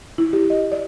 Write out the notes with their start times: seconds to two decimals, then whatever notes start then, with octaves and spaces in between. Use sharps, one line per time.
0.18 E4
0.33 G4
0.50 D#5
0.72 D5